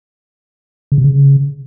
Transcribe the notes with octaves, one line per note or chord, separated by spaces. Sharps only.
C#3
C3
C#3